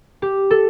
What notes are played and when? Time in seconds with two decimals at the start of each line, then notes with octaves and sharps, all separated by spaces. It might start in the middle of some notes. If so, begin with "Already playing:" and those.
0.22 G4
0.51 A4